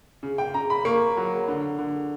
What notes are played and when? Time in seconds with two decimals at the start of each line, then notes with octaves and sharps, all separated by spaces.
0.23 C#3
0.38 G5
0.54 C#3 A#5
0.70 B5
0.85 A#3 C#6
1.17 F#3
1.48 D3
1.79 D3